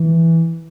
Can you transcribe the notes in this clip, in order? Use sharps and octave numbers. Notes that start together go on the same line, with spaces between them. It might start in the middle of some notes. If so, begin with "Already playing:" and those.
Already playing: E3